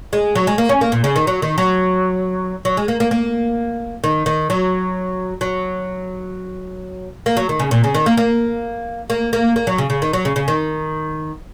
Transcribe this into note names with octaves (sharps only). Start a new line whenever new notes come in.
G#3
F#3
G#3
A#3
C#4
A#3
A#2
C#3
D#3
F#3
D#3
F#3
F#3
G#3
A#3
A#3
A#3
D#3
D#3
F#3
F#3
A#3
F#3
D#3
C#3
A#2
C#3
D#3
A#3
A#3
A#3
A#3
A#3
F#3
C#3
C#3
D#3
F#3
C#3
C#3
D#3